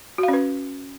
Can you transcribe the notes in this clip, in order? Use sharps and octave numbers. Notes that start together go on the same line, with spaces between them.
F#4
F5
C#4
B4